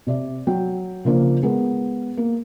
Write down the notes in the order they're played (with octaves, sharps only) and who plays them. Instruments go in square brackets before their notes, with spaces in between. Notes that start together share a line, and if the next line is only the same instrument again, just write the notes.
[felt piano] C3 D5 E5
F#3 G5
C#3 F3 A#3 D4 C5
G#3 B3 G#4 A#4
A#3